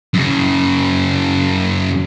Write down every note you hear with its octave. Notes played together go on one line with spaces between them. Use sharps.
F#2 C#3